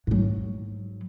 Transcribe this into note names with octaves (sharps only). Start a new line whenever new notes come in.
G#2 F#3